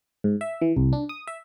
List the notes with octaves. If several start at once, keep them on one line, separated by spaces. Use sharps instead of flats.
G#2
E5
E3
C2
D4
D#6
E5